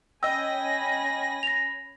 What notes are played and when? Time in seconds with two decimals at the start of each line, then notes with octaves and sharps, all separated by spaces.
0.23 C#4 D#5 G5 G#5 B5 E6 A#6
1.43 A#6 F7